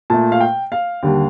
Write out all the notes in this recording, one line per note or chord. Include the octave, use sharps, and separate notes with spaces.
A#2 A3 A5
F5
G5
F5
D#2 D3 G3